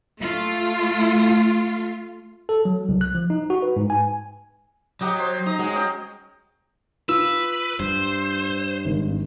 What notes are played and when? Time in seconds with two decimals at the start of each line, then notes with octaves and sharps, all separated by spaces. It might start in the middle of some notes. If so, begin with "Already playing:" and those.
0.19 A3 F4
2.49 A4
2.65 F#3
2.89 C2
3.01 F#6
3.15 F3
3.30 D#4
3.50 F#4
3.62 B4
3.76 G#2
3.90 G#5
5.01 F#3 D#4 G4 D#5
5.20 C5
5.46 D#4 D#5
5.59 F#3 G#3
5.75 C#4 D#5 G5
7.09 F4 B4 E6
7.80 G2 C5
8.85 G#1